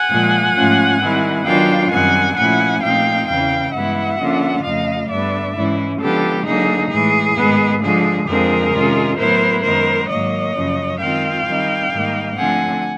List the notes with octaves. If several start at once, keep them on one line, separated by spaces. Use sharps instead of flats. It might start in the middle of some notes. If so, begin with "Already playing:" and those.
Already playing: F#5 G#5
A#2 F3 G#3
G#2 F3 A3 C#4 F4
D#3 G3 C4 E4
D#3 F#3 B3 D4 F4 F5 G5
F#2 D#3 G3 C4 F#5 G#5
A#2 F3 A3 C#4 E4 F#5 G#5
A#2 F3 A3 C4 D#4 F5 G5
E2 C#3 E3 F5 G5
G2 E3 G#3 B3 E4 E5 F#5
D3 F3 A#3 C#4 F4
F2 C#3 F3 A3 D#5 F5
G2 D3 G3 B3 D5 E5
G#2 E3 G#3 C#4 E4
D3 F3 G#3 B3 G4 A4
D3 F#3 A#3 D#4 G#4
A2 E3 G#3 G#4
G#2 D#3 G#3 B3
D3 F3 G#3 G#4
F2 D3 F3 G#3 C4 G#4 A#4
C3 D#3 G#3 C#4 F4
A2 F#3 B3 E4 A#4 C5
F#2 D#3 G#3 B3 A#4 C5
G#2 D#3 F#3 A#3 C#5 D#5
F#2 C#3 F3
D#3 G#3 C4 F4 F5 G5
D#3 G3 C4 D#4
G#2 D#3 G3 A#3 D#4
D3 F3 A3 C4 F#5 G#5